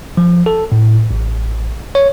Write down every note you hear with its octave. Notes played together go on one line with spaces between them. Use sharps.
F3
A4
A2
A1
C#5